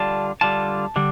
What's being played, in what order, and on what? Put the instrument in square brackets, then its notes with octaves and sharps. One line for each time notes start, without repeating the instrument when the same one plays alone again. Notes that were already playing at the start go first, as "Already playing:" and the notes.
Already playing: [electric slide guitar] D3 G3 D4 F4 A5
D3 G3 D4 F4 A5
D3 G3 D4